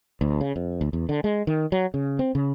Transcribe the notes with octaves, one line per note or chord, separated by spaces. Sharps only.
D2
C#3
F2
D2
E2
D3
G#3
D#3
F#3
C#3
C4
C#3